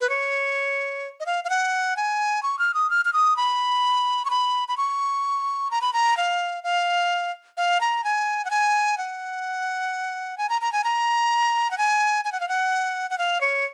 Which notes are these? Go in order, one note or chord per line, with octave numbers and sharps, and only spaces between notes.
B4
C#5
D#5
F5
F5
F#5
G#5
C#6
F6
D#6
F6
F6
D#6
B5
C#6
B5
B5
C#6
A#5
B5
A#5
F5
F5
F5
A#5
G#5
F#5
G#5
F#5
G#5
A#5
A#5
G#5
A#5
F#5
G#5
G#5
F#5
F5
F#5
F#5
F5
C#5